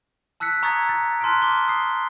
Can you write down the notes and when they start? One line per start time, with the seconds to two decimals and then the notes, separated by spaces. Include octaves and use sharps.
0.40 A5 E6 F#6 B6 C#7
0.63 A#5 C#6 D#6 E6 G#6 A6
0.89 A6
1.21 A5 C6 F6 F#6 B6 D7
1.42 D6 F6 G7
1.68 D#6 C7